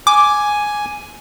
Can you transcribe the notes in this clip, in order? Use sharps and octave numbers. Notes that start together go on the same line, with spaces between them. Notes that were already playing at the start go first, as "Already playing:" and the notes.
G#5 D6